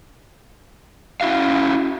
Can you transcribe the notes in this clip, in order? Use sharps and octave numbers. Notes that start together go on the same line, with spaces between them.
C#4 E4 F#4 F5